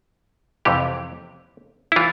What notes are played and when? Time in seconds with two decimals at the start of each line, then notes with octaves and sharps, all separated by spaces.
0.65 F2 C3 E3 G4
1.92 E4
1.96 E3 F4